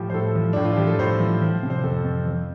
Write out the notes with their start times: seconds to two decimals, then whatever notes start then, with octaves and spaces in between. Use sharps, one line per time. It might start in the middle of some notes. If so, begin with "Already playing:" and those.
Already playing: A2 F3 G4
0.10 C5
0.14 A2 A4
0.35 F3
0.53 A2 D4
0.65 F4
0.76 F3 G4
0.87 A4
0.99 A2 C5
1.20 F3
1.41 F3
1.63 C3
1.70 C5
1.84 F2 A4
2.04 F2
2.26 F3